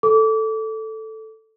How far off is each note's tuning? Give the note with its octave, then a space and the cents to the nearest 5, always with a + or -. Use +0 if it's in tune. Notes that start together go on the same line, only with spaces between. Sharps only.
A4 +0 D6 -30